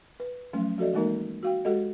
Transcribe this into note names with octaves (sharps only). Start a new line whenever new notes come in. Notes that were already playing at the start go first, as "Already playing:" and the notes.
B4
F3 F#3 A3 C#4
F3 F#4 A4 D5 D#5
E3 G#3 A#3 D#4 A#4 A#5
F#4 F5 G5
G#3 F#4 G4 A4 D#5